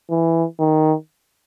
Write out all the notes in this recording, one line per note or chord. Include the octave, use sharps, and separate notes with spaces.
E3
D#3